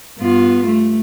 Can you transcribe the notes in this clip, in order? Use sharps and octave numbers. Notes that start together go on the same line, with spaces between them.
G2 B3 F4
A3